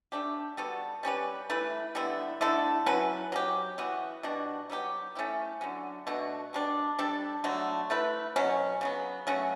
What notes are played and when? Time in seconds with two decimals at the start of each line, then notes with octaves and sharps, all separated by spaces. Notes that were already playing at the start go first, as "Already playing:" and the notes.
0.12 A3 D4 G4
0.57 G3 B3 F#4 A4
1.03 G3 C#4 G4 B4
1.50 E3 A3 E4 B4
1.95 D3 G3 B3 E4
2.41 D3 A3 E4 A4
2.86 F#3 C#4 E4 B4
3.32 F#3 C#4 G4
3.78 E3 B3 F#4
4.23 B2 G3 D4 F#4
4.70 F#3 B3 E4 G4
5.15 A3 C#4 E4 G4
5.61 D3 F#3 C#4
6.07 B2 A3 D4 F#4
6.53 B2 G3 D4
6.99 G3 D4 A4
7.44 D3 F#3 A3
7.90 A3 E4 B4
8.36 B2 F#3 C#4
8.81 C#3 F#3 B3
9.27 F#3 A3 C#4 F#4